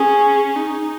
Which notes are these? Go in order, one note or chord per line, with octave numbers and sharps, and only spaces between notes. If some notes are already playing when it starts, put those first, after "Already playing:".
Already playing: C#4 G#4
D#4